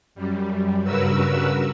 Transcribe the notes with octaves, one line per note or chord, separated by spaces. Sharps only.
F#2 G3
G2 C#3 F#4 A#4 B4 E6